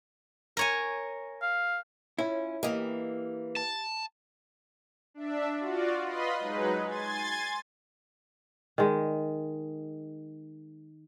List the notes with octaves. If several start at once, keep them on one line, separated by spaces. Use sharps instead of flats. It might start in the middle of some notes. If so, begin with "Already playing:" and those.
A#4 C#5 G#5
F5
C#4 E4 F4
E3 A#3 G4 D#5
A5
D4 E5
F4 F#4 D5
F4 B4 D#5 B5 C6
F#3 G#3 D#4 B4
G#5 C6 G#6 A6
D#3 G#3